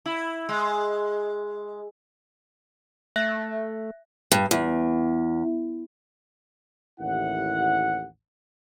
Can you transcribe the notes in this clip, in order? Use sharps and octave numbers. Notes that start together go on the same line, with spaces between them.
E4
G#3
A3 E5 F#6 A#6
G2
E2
A1 D#2 E4 F#5